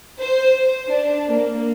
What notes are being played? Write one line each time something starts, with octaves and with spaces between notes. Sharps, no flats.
C5
D4
A#3